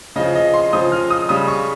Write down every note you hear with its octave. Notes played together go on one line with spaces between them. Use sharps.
C#3 F3 D#5
D#5
C6
C#3 F3 D#6
F6
D#6
C#3 G3 D#6
C#6